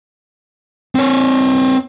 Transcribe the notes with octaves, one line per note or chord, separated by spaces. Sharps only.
C4 C#5